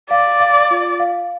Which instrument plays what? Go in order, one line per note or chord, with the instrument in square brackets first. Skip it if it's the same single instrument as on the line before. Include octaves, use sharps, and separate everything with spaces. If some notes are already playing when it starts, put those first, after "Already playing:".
[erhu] D5 [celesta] F5
[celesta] F5
F4
F5